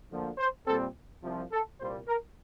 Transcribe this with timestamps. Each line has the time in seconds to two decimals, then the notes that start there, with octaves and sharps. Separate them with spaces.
0.10 D2 D3 F3 A#3
0.38 C5
0.66 A#2 G3 C4 A4
1.23 C2 C3 F3
1.52 A4
1.80 C2 A#2 G3 A#3 C5
2.08 A#4